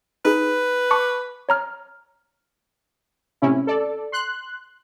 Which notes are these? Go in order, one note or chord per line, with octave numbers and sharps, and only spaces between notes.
D#4 G#4 B4
A5 C#6 D6
C#5 A#5 F6
A2 C3 C#4 E4
A4 D5
C6 F#6